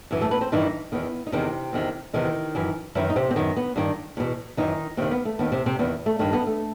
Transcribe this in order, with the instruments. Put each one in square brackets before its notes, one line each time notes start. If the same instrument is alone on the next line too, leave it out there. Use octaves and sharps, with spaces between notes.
[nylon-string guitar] F#2 E3
A3 A4
B3 B4
C4 C5
G2 D#3 E3 D#4
E2 D#3 B3
D#4
E2 C3 D#3 C4
E2 C3 D#3
E2 C3 D#3 E3 D#4
F#2 E3
F#2 D#3 E3 E4
D#4
C3 C4
C4
F#2 D#3 B3
B3
G2 D#3
E2 B2
F#2 D#3 E3 D#4
D#2 C3 D#3 C4
B3
A3
D#2 D#3 B3
C3 C4
C3 C4
E2 D#3 B3
A3
G2 D#3 A3
B3
A3